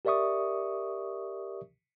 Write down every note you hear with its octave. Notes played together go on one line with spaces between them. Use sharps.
G4 A#4 D5 E5 C#6 D#6